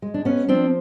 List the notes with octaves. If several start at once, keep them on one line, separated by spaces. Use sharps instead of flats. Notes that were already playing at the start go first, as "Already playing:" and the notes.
G#3
D4
B3 C#4
F3 C4 D4